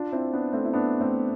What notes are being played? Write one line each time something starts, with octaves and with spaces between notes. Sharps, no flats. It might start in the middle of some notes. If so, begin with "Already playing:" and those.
Already playing: D4 F4
C4 E4
B3 D4
A3 C4
E4
B3 D4
A3 C4